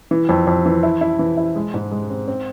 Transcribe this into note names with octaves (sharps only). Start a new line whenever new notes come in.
E3
F2
F2
E3
E4
E4
E3
E4
G#3
G#2
G#3
C4
C4